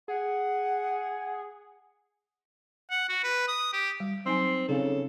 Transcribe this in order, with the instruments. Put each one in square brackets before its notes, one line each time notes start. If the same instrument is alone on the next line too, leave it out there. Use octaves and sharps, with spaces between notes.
[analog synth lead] G#4 [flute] F#5
[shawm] F#5
F#4
B4
D#6
G4
[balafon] G3
[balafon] F#3 D#4 G#5 [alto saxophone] C4 [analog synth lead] C6
[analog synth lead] C#3 [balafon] C4 D#4 [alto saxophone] A4